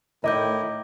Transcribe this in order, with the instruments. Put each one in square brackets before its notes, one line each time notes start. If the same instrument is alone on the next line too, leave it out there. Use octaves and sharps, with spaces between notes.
[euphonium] A2 [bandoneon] D#3 E4 [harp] D#5 [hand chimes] A#5 D6 G6